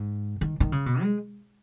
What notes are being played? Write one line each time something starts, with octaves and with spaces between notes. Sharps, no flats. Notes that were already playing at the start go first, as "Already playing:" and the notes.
Already playing: G#2
D#3
D#3
C#3
B2
G#3